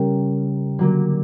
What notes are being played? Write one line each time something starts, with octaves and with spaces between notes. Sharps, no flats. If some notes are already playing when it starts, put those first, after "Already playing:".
Already playing: C#3 G3 C#4 G4 A#4
D3 F#3 A#3